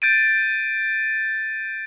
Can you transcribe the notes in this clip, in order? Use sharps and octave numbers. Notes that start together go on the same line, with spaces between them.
G6 A6 D7 D#7